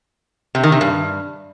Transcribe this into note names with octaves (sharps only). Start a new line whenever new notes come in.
C3
D#3
C3
G2